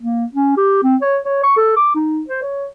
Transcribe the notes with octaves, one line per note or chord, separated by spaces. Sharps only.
A#3
C#4
G4
C4
C#5
C#5
C#6
A4
D6
D#4
C5
C#5